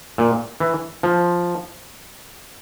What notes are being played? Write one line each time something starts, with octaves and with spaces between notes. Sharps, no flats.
A#2
E3
F3